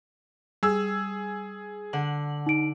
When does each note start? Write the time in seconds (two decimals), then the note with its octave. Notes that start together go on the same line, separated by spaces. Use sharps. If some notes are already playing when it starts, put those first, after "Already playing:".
0.63 G3 G#4 E6
1.93 D3 F#5 F#7
2.47 D#4 D7